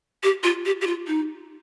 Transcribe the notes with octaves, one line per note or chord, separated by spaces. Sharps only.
G4
F4
G4
G4
F4
D#4